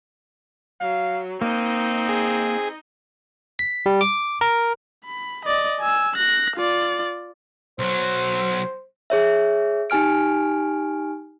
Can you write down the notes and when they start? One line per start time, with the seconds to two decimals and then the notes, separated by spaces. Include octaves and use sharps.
0.81 F#3 F5
1.42 A#3 C4 D#4 D#5
2.09 G#4
3.59 B6
3.86 G3
4.01 D6
4.41 A#4
5.05 B5
5.45 D5 D#5
5.80 G#5 E6
6.16 F#6 A#6
6.57 F4 D5
7.79 B1 F#3 C5
9.10 G#4 C#5 E5
9.90 D#4 G4 G#5 F6 D7